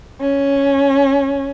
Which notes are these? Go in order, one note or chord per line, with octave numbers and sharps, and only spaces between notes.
C#4